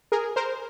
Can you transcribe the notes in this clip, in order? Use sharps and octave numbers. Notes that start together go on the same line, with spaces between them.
G#4 A#4
A#4 C5